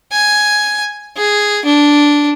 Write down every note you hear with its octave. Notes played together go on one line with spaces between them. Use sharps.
G#5
G#4
D4